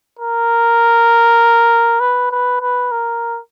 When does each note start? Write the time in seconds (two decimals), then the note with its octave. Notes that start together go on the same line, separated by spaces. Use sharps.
0.19 A#4
2.00 B4
2.31 B4
2.61 B4
2.91 A#4